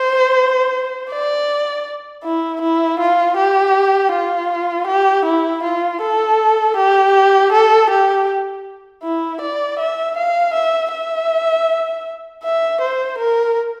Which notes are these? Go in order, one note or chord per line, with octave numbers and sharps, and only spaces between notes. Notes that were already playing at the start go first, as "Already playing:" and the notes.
Already playing: C5
D5
E4
E4
F4
G4
F4
G4
E4
F4
A4
G4
A4
G4
E4
D5
E5
F5
E5
E5
E5
C5
A#4